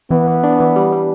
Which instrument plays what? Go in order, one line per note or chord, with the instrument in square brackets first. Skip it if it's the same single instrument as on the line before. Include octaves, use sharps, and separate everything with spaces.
[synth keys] E3 [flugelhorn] B3
[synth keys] E3
D4
E3
G3
G3